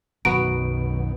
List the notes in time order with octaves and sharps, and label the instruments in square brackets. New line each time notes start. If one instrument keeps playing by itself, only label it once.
[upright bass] B1 [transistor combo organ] F#2 B2 D#3 [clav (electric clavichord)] B3 F#4 A#5 [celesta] D7